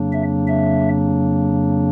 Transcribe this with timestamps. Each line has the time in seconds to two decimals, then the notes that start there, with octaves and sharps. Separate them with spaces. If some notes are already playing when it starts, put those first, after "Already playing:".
Already playing: F2 C#3 F#3 A#3 D4
0.13 E5
0.47 E5